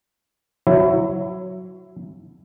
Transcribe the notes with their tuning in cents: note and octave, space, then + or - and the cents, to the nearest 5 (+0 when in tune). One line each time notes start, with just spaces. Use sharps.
F#3 +0 E4 +15